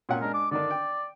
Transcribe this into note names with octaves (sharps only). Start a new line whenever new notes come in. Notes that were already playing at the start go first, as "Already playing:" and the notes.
A#2 C#4 F#5
G#3 D4 A#4
D6
D3 D#3 D4 D5
G5